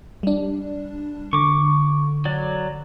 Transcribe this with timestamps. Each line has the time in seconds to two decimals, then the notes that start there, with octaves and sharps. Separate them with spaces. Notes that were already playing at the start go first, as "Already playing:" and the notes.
0.23 G3 D4
1.33 D3 C#6 D6
2.25 F#3 D5